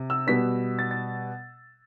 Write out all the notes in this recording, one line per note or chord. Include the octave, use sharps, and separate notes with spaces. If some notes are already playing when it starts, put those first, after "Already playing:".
Already playing: C3
E6
B2 G3 B3 B6
A6
A6